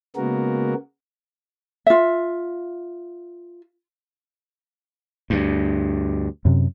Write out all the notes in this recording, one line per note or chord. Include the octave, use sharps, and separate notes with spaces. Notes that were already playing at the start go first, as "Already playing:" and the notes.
C#3 G#3 A#3 B3 F#4 A#4
F4 E5
D2 G2
F#2 C3